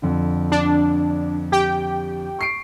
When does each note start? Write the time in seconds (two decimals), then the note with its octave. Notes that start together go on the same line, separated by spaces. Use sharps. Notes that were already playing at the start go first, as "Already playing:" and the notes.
0.02 F2 D3
0.52 D4
1.52 G4 G5
2.39 C#6 C7 D7